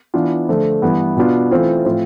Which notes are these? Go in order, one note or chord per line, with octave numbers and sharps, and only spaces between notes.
E3 B3 D4 F4
D3 F3 A3
G2 E3 B3
B2 B3 D4 F4
E3 A3 C4 F4
A2 F3 C4 F4